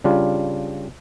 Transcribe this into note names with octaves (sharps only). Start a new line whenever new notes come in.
C#3 G3 D4 F4